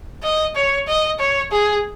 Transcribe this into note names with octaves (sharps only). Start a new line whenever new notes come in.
D#5
C#5
D#5
C#5
G#4